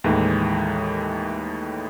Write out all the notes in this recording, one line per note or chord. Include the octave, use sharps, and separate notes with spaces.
D#2 A2 D#3 E3 G#3